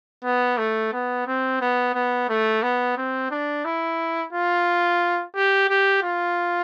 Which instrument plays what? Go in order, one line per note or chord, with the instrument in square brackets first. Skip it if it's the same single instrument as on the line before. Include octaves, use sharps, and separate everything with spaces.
[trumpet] B3
A3
B3
C4
B3
B3
A3
B3
C4
D4
E4
F4
G4
G4
F4